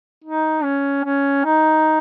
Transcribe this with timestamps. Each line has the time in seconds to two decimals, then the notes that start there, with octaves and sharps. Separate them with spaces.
0.24 D#4
0.63 C#4
1.04 C#4
1.45 D#4